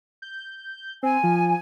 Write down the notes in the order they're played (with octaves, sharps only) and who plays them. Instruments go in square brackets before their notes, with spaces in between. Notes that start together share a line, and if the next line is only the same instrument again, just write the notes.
[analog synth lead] G6
[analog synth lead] C4 [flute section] G#5
[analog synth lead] F3